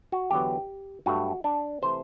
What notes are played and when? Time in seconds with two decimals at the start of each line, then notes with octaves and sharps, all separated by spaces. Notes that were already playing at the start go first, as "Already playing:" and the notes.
0.12 F#4
0.31 E2 D3 F#3 B3 G4
1.06 G2 F#3 A3 F#4
1.44 D4
1.82 C3 E3 A3 C5